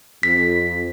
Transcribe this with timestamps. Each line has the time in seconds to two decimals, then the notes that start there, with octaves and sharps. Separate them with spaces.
0.23 F2 B6